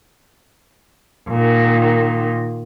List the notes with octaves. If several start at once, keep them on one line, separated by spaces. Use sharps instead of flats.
A#2 D#3